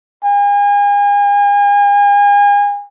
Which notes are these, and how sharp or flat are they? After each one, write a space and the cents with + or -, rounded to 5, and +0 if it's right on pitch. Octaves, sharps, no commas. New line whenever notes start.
G#5 -35